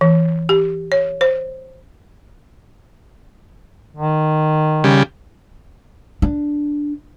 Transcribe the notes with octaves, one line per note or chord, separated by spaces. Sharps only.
E3
G4
C#5
C5
D#3
C#3 G3
D4